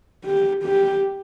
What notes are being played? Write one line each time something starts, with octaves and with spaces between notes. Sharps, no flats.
G4
G4